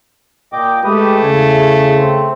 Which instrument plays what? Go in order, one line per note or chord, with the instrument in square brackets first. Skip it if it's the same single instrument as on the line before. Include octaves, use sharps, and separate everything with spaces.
[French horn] A#2 [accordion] D#5 G5 D6
[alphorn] G#3 [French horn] A3 [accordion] G4 B4 D#6
[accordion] E2 G#5 [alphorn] C#3
[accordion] C4